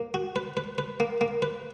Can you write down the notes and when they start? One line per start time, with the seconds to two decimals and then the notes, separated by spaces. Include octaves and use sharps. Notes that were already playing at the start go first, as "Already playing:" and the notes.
Already playing: A#3
0.14 F#4
0.36 B4
0.57 B4
0.78 B4
1.00 A#3
1.21 A#3
1.42 B4